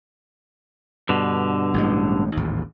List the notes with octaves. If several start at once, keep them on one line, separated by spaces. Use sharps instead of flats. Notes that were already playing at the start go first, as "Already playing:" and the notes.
G2 B2 D3
A1 A2 G#3
A1 D#2 G#2